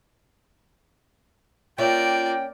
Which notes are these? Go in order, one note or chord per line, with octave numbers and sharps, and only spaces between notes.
A#3 C#4 F4 D5 E5 F5 G5